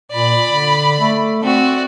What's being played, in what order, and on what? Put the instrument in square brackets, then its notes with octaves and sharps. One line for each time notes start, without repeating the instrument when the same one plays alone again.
[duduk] A#2 [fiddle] D5 B5
[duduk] D3
A3
[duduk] C4 [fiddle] F#4 D5